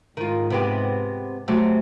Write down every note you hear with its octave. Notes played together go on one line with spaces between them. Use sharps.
G#2 D#3 F4
C3 B3 G4
C3 F#3 A3 F#4